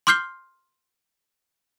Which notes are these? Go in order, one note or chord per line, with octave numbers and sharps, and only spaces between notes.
C6 D6 F6 G6 C7 G7